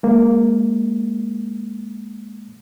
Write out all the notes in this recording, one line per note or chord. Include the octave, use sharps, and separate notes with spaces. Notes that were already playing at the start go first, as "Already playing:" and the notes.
G#3 A#3